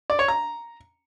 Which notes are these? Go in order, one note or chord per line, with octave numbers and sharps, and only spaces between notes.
D5
C#5
A#5